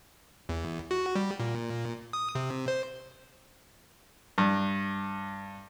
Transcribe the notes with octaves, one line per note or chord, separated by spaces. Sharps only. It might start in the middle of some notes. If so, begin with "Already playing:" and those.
E2
F#4
G3
A#2
D#6
C3
C5
G2